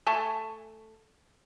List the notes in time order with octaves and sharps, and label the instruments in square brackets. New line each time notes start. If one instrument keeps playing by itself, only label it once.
[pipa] A3 G#5 A5 C#6